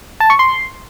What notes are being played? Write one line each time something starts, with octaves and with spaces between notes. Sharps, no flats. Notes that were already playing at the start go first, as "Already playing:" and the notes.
A5
C#6
C6